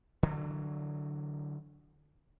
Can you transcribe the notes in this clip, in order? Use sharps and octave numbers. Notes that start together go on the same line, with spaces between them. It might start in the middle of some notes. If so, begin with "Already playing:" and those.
D3 E3 F#3